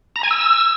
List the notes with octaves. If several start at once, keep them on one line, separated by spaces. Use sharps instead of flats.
A#5
G#5
E6